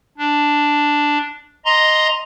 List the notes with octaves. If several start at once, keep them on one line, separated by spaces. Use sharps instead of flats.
D4
D#5 A#5 C6